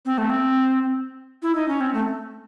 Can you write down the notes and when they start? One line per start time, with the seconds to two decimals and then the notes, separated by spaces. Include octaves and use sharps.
0.05 C4
0.18 A3
0.30 C4
1.42 E4
1.55 D#4
1.68 C#4
1.81 C4
1.94 A3